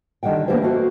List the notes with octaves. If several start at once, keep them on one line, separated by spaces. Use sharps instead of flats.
D3 D#3 G3 F#5 G5
E3 A#3 B3 D4 G4 C5
A3 A#3 F#4 C5